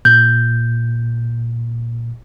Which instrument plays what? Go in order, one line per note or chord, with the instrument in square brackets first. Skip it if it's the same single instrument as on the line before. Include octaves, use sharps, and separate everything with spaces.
[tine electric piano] A#2 [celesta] G6